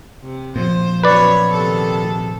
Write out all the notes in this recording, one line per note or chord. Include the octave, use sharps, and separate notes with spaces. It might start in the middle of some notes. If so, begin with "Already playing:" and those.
C3
A#2 F3 C5
F#2 B2 B4 C#5 D5
C3 D#3 A4